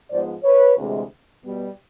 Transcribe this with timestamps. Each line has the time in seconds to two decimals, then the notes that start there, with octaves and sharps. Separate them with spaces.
0.10 G#2 F3 G#3 B3 C5 D5
0.43 B4 C#5
0.77 D2 C3 E3 G#3
1.44 B2 G3 B3